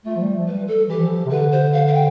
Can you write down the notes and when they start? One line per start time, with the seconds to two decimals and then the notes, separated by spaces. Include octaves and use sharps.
0.05 A3 F4
0.15 F3
0.21 G3
0.37 F3
0.47 B4
0.52 G3
0.67 A4
0.88 E3 G4
1.00 F3
1.26 C3
1.31 D3 B4
1.52 C5
1.73 F5
1.87 F5
1.93 G5